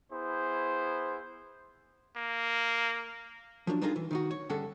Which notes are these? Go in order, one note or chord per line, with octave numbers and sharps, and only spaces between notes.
B3 E4 G#4 C5
A#3
F3 F#3 A#3 D4
G3 D4 D#4 F4 G#4 A#4
E3
D#3 D#4 F#4
C#5
G2 D3 C#4 G#4 A4 F#5